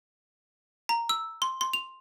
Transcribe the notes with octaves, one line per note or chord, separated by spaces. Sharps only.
A#5
E6
C6
C6
F7